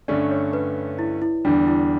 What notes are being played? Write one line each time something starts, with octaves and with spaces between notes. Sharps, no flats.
G2 D3 A3 C#4 D5
C#5
B4
E4
E4
E2 D3 G3 D4
E4